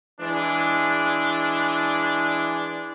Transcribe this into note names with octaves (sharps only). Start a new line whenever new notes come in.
E3 G#3 D4